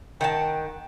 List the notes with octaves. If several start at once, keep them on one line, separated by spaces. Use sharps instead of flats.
D#3 F#5 G5 A5